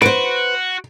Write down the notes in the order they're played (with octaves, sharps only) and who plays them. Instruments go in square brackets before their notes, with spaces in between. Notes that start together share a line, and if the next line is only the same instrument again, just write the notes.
[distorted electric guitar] F#4 [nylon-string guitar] B4 C5 [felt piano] D7